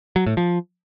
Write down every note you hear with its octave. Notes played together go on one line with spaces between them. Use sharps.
F#3
A2
F3